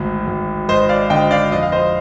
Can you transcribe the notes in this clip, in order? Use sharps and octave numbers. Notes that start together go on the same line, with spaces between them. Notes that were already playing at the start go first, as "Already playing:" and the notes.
Already playing: G#1 D2
G#1
G#1 C5 D#5
D5 F5
D3 D#5 G5
D5 F5
F2 D#5
F5
C5 D#5